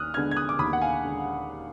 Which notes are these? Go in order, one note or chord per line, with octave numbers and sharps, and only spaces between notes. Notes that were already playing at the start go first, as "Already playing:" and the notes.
Already playing: D#2 D#6 F6 F#6
D3 G#3 B3 D4 F6 G#6
G#6
D#6 F#6
D6
D#2 B5 D#6
F#5
F5 G#5
D3 G#3